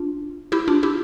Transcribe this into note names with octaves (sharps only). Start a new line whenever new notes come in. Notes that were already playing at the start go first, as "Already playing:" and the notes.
Already playing: D4 F4
E4 G4
D4 F4
E4 G4